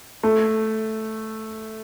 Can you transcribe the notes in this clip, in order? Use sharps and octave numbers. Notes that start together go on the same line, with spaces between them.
A3